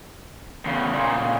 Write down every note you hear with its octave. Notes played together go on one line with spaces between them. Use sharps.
E2 C#3
A#2 C#3